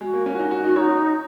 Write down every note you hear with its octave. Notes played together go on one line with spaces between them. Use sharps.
G#3 F#4
A#3
C#4
F#4
D#4
F#4
D#4 F#4
D#4 C#5